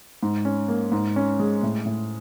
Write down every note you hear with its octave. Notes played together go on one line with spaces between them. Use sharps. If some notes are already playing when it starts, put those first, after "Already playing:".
G#2
C#4
A#3
G#2
C#4
G#3
A2
A2